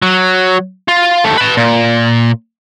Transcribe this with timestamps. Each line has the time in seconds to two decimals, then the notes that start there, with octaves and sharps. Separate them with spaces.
0.02 F#3
0.89 F4
1.24 D#2 A3
1.38 B4 A5
1.57 A#2